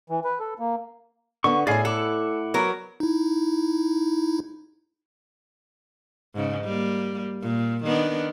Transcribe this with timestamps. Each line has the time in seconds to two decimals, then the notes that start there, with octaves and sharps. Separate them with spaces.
0.10 E3
0.24 B4
0.40 A4
0.59 A#3
1.44 D3 B3 C#6
1.67 A2 E4 G#4 D5 F5 G#5
1.85 A4 F#5 D6
2.54 F#3 B3 A#4
3.00 D#4 E4
6.35 G#2 C#3
6.64 G3 A#3
7.42 A#2
7.84 D#3 B3 D4